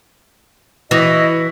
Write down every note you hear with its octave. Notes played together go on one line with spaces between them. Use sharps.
E3 E4 F#4 D#5